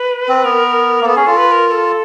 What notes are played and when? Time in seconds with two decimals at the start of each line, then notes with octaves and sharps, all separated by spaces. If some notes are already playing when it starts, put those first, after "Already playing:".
Already playing: B4
0.29 C4
0.44 B3 A#4
1.01 A#3
1.05 B3 A4
1.16 C#4 G#4
1.27 F4 A4
1.37 B4
1.52 A#4
1.67 A#4
1.71 A4